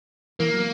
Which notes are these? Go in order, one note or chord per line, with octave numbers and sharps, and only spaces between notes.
E3 A#3
F#3